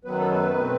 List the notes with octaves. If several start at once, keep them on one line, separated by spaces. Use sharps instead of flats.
F#2 D#3 F#3 B3 B4
A4
B4
B2 A3 C4